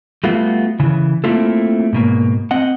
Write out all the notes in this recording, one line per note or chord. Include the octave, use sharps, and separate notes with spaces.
G3 A3 B3 F4 F#4
C#3 E3
A3 A#3 C4 E4 F4 A4
G#2 B2 A#3
C4 D#5 F#5